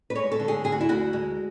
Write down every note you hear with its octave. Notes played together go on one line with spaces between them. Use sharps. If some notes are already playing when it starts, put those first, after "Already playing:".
B4
G#3 C#5
A4
D3
G#4
D2 G#4
F#4
E4
D2 F#4
G#3